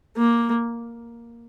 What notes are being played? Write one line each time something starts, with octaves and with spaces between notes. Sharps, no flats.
A#3